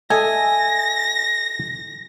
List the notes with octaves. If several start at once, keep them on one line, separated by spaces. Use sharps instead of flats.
A4 D#5 E5 G#5 A#6